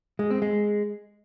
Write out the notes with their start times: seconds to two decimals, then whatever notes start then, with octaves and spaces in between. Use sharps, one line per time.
0.19 G#3
0.30 C4
0.42 G#3